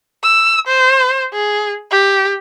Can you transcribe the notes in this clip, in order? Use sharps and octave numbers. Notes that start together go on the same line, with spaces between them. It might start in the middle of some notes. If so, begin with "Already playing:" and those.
E6
C5
G#4
G4